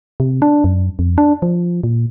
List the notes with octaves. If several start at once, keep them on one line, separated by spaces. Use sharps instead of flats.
C3
D4
F#2
F2
D4
F3
A#2